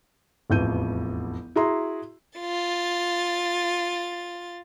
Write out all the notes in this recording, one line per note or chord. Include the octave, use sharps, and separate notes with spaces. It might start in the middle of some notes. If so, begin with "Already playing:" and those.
E1 A1 F2 G6 D#7
E4 F#4 G#4 E5 A#5 C6
F4 A6